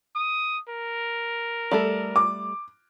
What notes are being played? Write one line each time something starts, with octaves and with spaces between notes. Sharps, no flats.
D#6
A#4
G3 A3 A4
D6